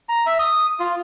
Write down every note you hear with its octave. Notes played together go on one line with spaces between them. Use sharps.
A#5
E5
D#6
F4